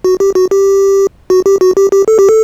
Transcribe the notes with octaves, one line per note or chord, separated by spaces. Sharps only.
F#4
G4
F#4
G4
F#4
G4
F#4
G4
G4
A4
G4
A4